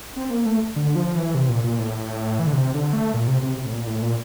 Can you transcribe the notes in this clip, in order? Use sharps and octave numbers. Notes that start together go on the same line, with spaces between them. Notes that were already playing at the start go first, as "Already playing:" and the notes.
C4
A#3
A3
D3
F3
E3
C3
A#2
A#2
A2
E3
D3
C3
D3
A3
A#2
C3
C3
C3
A2
A#2
A2
A#2